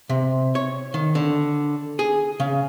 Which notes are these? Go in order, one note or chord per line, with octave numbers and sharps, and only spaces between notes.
C3
C#5
D#3
D3
G#4
C#3